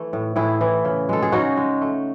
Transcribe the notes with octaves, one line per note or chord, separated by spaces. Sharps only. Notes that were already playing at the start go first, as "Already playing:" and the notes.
Already playing: E3 A3
A2
A2 E4 G#4
E3
C#3
G#3 A4
G#4
C#3 D#4 F#4
G#3
A3